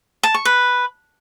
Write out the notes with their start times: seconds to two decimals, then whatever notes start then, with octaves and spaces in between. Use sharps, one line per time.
0.23 A5
0.34 C#6
0.45 B4